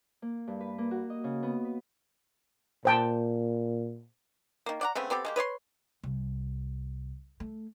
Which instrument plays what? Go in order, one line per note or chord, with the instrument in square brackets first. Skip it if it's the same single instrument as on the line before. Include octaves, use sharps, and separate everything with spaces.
[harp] A#3
G2
B4
A#3
F#4
D#5
C#3
B3
B4
[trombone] A#2 [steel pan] C5 G5 A5
[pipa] D#3 A#3
D5 F#5 A#5
C#3 A3 B3 C4
B3 C4 G4 A4
G#3 A#3 G4
B4 C#5 D5 C6
[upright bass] C2
A3